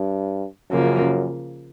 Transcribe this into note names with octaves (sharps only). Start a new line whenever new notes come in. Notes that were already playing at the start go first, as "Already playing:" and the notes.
Already playing: G2
F#2 C#3 F3 A#3